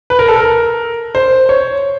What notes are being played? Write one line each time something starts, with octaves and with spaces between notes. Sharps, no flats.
B4
A#4
A4
A#4
C5
C#5